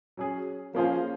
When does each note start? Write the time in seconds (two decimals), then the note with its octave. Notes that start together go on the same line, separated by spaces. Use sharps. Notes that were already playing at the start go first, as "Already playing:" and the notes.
0.17 F#3 C#4 G#4
0.75 F3 A#3 C#4 G#4 C5 F5